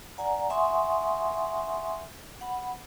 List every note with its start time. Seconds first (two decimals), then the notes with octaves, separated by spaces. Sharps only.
0.18 D5 F#5 G#5 A#5
0.50 E5 F#5 G#5 C6 C#6 D#6
2.41 F#5 B5